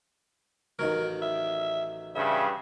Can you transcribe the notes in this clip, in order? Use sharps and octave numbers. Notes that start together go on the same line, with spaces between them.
A1 D#3 F#3 A#4
E5
G2 C#3 E5